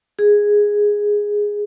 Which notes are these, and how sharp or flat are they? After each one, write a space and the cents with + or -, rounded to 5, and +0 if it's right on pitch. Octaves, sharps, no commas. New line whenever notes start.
G#4 -5